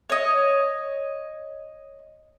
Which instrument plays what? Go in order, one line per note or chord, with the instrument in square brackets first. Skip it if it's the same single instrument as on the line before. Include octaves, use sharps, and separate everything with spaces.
[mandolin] C#5 D#5